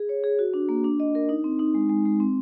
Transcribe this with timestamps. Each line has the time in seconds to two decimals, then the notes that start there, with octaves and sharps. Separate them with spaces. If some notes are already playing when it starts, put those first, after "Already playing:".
Already playing: G#4
0.09 C#5
0.24 G#4
0.39 F#4
0.54 D4
0.69 A#3
0.84 D4
1.00 D#5
1.15 A#4
1.29 D#4
1.44 C4
1.59 D#4
1.74 G#3
1.89 G#3
2.05 G#3
2.20 C4